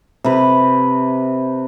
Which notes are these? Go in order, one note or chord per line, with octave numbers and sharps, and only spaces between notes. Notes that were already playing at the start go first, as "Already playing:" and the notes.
C3 B4